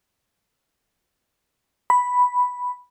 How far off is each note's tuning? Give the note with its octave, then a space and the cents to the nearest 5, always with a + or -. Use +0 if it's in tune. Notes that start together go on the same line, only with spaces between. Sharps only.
B5 +0